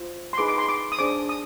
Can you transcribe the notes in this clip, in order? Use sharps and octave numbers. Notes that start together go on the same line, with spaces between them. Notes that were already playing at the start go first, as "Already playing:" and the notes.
Already playing: F4 C5
C6
D#4 G#4 B4 D6
D6
C6
D6
D#6
D4 G#4 C5 D6
D#6